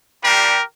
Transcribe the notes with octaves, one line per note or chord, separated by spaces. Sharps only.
G3 D4 F4 G4 A#4